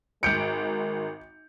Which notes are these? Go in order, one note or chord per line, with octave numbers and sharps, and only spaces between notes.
G#1 G#3 F#4 A#4 G6 C#7 D7